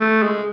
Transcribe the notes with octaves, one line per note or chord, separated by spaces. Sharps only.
A3
G#3